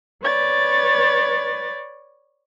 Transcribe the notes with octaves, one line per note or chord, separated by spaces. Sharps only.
B4 C#5 D5 A6